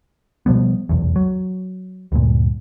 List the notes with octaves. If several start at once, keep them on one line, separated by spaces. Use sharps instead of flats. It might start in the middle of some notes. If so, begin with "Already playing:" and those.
B2 F3 G3 B3
F1 B1 E2
F#3
D2 G2 A#2